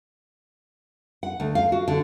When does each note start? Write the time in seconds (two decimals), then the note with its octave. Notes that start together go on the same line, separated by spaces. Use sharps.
1.23 F#5
1.40 D2
1.55 F5
1.72 F#4
1.88 D3